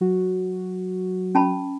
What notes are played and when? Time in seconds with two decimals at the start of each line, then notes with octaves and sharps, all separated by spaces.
0.01 F#3 F#4
1.35 C#4 A5 B5